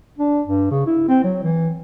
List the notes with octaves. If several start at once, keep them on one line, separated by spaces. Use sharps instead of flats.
D4
G2
C#3
E4
C4
F#3
E3